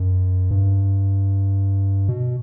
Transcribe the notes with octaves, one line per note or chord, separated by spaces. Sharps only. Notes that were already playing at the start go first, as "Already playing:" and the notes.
Already playing: F#2
G2
B2